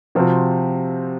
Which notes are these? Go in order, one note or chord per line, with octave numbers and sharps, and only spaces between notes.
C3 F3 C4 F#4 C5